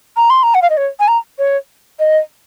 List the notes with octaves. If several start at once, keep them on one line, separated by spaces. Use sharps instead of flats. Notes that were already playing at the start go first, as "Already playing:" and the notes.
A#5
C6
A#5
F#5
F5
D#5
C#5
G#5
A#5
C#5
D#5